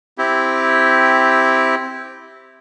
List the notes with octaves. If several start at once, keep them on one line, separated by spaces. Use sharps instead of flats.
C4 E4 G4